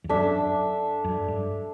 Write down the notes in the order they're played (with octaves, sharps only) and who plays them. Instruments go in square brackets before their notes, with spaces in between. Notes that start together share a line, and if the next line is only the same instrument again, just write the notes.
[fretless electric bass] E2
[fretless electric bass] F#2 [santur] D4 A4 E5
[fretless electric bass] F#2
G2